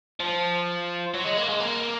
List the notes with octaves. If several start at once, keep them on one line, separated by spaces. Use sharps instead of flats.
F3
F#3
G#3
A#3
G#3
A#3